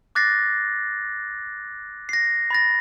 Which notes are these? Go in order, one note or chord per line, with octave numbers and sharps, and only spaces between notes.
D6 F#6 A6 A#6 C7
A#6 C7
B5 A6 A#6